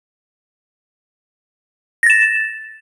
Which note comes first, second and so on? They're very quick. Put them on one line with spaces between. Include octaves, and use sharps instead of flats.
A#6 A6 E7